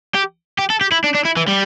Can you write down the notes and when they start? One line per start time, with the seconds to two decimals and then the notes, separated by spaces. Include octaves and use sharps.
0.14 G4
0.59 G4
0.70 A4
0.81 G4
0.92 E4
1.04 D4
1.14 D4
1.25 E4
1.37 E3
1.48 G3